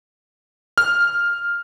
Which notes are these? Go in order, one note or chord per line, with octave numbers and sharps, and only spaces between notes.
F6